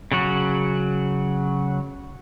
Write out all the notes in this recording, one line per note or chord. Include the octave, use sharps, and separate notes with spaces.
C#3 F#3 F#4